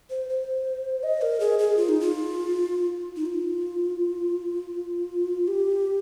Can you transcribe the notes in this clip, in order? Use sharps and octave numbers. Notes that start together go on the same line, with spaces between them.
C5
C5
D#5
A#4
G#4
G#4
F4
D#4
F4
D#4
F4
G4